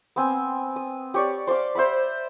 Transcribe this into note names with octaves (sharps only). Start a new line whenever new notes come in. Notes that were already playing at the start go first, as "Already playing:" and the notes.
B3 C4 G#5
D#6
G4 C#5 D5
C5 D5 F5 D6
C5 E5 F#5 B5